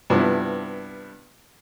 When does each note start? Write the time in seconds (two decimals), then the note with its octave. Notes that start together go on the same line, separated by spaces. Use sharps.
0.10 G2 C3 F3 B3 E4